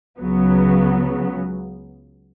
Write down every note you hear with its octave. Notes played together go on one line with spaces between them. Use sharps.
C#2 C#3 F#3 B3